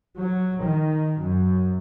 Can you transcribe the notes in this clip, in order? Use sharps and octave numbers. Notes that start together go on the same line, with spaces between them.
F#3
D#3
F#2